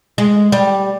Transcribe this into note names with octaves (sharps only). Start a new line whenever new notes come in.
G#3
G3